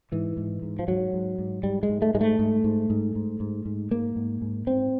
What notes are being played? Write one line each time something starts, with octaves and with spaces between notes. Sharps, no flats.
G#2 E3
G#2
G#2
F3
G#2 F#3
G#2
G#2
G#2 G3
G#3
G#2
A3
G#2 G#3
A3
G#2
G#2
G#2
G#2
G#2
G#2
G#2 A#3
G#2
G#2
G#2 C4